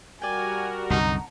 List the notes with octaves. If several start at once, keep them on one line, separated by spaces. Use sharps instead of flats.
G3 F#4 A#4 D5 G5 G#5
C2 F#2 D3 D#4 F#5 A5 A#5